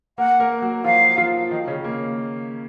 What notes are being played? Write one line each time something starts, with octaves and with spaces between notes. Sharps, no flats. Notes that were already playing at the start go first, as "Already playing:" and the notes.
A#3 A#4 F#5
A#3 A#4
F#3 F#4
F3 F4 F5
F3 F4
D#3 D#4
C#3 C#4
A#3